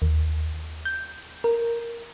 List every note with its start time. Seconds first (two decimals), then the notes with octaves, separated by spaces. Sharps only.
0.02 D#2
0.85 G6
1.44 A#4